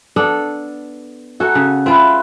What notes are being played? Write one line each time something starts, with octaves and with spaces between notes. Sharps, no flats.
B3 D4 A4
F#4 A4 F#5 G#5 A#5
C#3
G#3 C4 F4 B4 E5